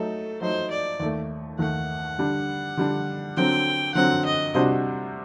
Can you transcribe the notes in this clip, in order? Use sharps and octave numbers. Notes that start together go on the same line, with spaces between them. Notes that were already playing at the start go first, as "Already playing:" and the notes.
Already playing: F#3 A3 D#4 A4
F#3 A3 D#4 C5
D5
D#2 D#3 A3
D#2 D#3 A3 F#5
D3 G3 D4
D3 G3 D4
D3 F#3 C4 G5
D3 F#3 C4 F#5
D#5
C3 G3 D4 F#4 C5